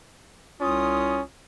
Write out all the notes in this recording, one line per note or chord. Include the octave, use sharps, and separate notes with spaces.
C2 C#4 F4 D#6